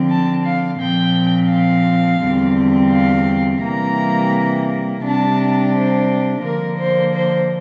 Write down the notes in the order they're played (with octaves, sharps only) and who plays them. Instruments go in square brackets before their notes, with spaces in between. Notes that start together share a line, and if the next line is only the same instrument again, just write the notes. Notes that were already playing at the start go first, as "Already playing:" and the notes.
Already playing: [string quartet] D3 F3 C4
A5
F5
A#2 F3 C4 G5
F5
E2 D3 G3 C4
F5
C3 E3 G3 A#3 A#5
C3 G3 D4 A5
C5
D3 F3 A#3 A#4
C5
C5